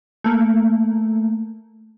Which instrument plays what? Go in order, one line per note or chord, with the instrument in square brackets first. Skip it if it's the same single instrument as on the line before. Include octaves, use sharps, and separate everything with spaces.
[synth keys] A3 A#3